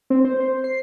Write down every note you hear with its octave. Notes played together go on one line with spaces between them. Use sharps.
C4
C5
C5
C7